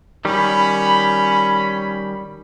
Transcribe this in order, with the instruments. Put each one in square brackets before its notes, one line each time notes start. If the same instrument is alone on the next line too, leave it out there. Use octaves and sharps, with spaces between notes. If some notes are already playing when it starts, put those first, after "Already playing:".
[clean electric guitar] D#3 G3 [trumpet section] C#4 B5